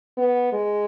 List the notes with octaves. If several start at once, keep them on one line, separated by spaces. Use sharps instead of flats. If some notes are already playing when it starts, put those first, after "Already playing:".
B3
G#3